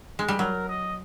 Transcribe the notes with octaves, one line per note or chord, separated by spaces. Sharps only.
G#3
G3
F#3 A#4
D#5